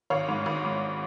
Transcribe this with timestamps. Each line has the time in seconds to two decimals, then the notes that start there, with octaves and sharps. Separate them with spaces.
0.10 G#1 C#5 F5
0.29 G#2
0.46 G#1
0.65 G#2